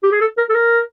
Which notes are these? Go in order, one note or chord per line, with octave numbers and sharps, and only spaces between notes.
G4
G#4
A4
A#4
A4
A#4